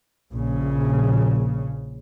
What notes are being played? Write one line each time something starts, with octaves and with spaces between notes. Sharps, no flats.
A#1 C#3